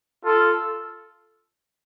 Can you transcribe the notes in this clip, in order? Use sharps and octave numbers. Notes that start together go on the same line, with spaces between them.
F4 A4